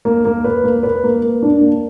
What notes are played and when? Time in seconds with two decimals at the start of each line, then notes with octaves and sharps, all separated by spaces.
0.05 A#3
0.25 A#3
0.44 B4
0.63 A#3
0.83 B4
1.04 A#3
1.22 A#3
1.43 D4
1.61 A#3